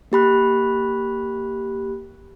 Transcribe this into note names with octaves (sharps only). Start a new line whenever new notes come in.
A#3 G4 B5 F#6